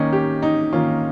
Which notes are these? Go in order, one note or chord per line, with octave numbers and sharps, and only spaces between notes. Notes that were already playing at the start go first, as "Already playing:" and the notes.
Already playing: D#3 A#3 C#4 D#5
G4
D#4
D#3 A#3 C#4 F4